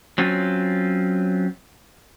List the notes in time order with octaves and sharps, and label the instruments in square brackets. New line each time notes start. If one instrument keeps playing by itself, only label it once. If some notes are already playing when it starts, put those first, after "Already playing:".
[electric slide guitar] F#3 C4 C#4 F4